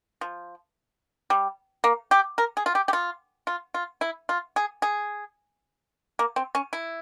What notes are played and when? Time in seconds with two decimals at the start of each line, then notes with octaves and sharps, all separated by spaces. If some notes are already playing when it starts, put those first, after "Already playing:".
0.21 F3
1.30 G3
1.84 A#3
2.11 G4
2.38 A#4
2.57 G#4
2.66 F4
2.75 G4
2.88 G4
2.93 F4
3.47 F4
3.74 F4
4.01 E4
4.29 F4
4.56 G#4
4.82 G#4
6.19 A#3
6.36 C4
6.55 C#4
6.73 E4